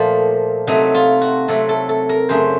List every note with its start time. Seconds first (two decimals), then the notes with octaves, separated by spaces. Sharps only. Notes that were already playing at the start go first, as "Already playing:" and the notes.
Already playing: A#2 F3 A3
0.67 C3 F#3 A3 D#4
0.95 F4
1.22 F#4
1.48 C3 F#3 A3 A4
1.69 A4
1.89 A4
2.09 A#4
2.29 F#2 C#3 A3 C5